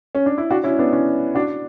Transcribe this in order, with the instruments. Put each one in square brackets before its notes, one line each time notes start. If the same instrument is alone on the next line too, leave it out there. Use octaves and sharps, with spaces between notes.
[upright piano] C#4
D4
E4
D4 F#4
C#4 E4
B3 D4
C#4 E4
D4 F#4